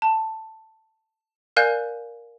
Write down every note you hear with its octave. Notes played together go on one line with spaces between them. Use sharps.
A5
A#4 D5 F5 G#5 F#6 G6